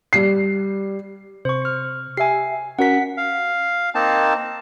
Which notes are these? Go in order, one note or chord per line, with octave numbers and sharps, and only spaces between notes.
G3 C7
C3 C5 C#6
F6 C#7
G4 E5 G#5 C7
C#4 F#4 A#4 F#5 B6
F5
A#3 C4 D#4 A5